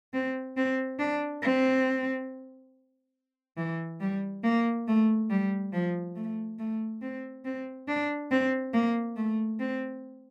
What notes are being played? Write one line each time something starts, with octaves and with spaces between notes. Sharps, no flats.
C4
C4
D4
C4
E3
G3
A#3
A3
G3
F3
A3
A3
C4
C4
D4
C4
A#3
A3
C4